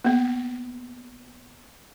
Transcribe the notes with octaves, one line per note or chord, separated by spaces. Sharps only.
A#3 B3